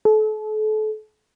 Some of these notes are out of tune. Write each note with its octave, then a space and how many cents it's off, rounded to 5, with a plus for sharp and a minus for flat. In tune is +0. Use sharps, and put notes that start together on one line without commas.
A4 -35